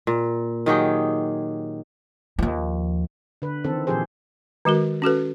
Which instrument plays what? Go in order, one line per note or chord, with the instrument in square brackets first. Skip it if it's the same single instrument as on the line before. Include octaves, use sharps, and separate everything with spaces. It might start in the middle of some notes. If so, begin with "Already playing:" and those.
[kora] A#2
D#3 F#3 G4 G#4
[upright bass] D#2 F3
[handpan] D3 B4
D#3 E3 C4 A4
A#2 E3 F3 G4 G#4 C5
[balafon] D#3 G#3 F#4 A#4
C#4 F#4 A4 B4